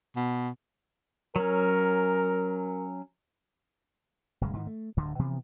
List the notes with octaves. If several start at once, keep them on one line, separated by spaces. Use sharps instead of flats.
B2
F#3 C#4 A#4
D1 F#2 C#3 G#3
G#2 D#3 E3
A3
D1 D2 G2 D3
B2 E3 F3 B3